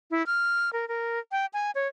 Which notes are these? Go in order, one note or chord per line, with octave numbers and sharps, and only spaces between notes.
E4
F6
A#4
A#4
G5
G#5
C#5